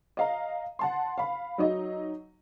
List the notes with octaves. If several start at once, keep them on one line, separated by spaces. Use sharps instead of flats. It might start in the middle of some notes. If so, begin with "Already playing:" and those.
D#5 F5 A#5
F#5 A5 C6
F5 B5
F#3 D#4 D#5